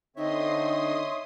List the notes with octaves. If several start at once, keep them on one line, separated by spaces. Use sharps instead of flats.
D3 C4 D#4 C#5 E5 C6 D#6